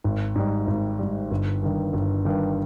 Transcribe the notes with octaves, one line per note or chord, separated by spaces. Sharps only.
G#1
G#2 G3
G#1
G#2 G3
G1
G2 D#3
G1
G2 D#3